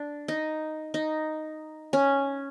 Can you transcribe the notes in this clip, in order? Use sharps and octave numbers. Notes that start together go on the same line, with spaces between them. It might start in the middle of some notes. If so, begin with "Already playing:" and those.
Already playing: D4
D#4
D#4
C#4